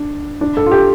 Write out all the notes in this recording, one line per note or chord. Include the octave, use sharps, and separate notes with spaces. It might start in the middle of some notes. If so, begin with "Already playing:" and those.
Already playing: D4
D4
A4
F4
G4